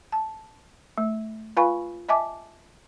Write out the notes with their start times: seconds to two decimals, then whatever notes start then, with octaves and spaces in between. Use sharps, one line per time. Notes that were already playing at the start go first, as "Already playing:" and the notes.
0.12 A5
0.98 A3
1.57 F4 B4 F5 G#5 B5 C#6
2.09 D#5 E5 G#5 A5 D6